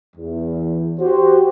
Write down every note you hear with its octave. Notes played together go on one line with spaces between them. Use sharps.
E2
F#4 G4 C5